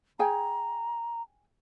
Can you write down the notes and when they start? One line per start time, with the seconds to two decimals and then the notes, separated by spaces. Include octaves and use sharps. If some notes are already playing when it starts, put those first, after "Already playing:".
0.19 G#4 G5 G#5 A#5